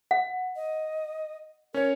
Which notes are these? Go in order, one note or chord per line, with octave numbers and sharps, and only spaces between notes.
F#5
D#5
C#4 A#4 C#5